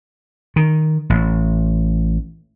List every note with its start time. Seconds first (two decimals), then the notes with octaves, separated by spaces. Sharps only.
0.56 D#3
1.10 A1